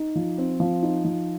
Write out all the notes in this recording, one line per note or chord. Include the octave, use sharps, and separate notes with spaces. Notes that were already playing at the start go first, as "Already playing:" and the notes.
Already playing: D#4
F3
C4
F3
D#4
F3